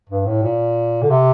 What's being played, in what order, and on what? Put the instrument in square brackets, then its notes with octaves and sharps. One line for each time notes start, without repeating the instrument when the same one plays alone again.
[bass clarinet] G2
A2
A#2
D3
C3